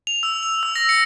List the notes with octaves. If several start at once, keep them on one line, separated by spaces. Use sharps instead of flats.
F7
E6
F7
E6
A#6
C#7